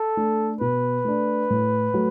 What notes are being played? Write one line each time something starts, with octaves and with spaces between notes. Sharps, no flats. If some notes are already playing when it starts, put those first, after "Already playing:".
Already playing: A4
A3 D4
B2 B4
A3 D4
A2
F#3 A3